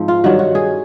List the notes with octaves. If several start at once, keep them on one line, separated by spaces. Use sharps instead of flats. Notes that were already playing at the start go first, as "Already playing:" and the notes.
Already playing: G#2 F3 C4
F4
G2 D#3 F#3 F#4
F#4
G#4